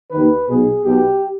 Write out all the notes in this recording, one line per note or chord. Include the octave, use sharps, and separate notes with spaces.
D#2 D#3 B4
B1 B2 G#4
B1 B2 G4